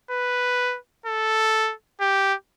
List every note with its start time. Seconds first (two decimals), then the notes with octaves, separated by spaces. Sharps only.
0.11 B4
1.06 A4
2.01 G4